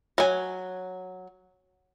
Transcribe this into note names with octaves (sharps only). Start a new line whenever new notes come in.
F#3 G#5